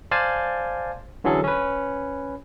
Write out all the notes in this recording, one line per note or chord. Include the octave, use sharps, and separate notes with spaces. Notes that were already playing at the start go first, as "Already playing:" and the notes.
C5 D5 F5 G#5 A5
D3 E3 F#3 C#4 G#4 A4
C#4 B4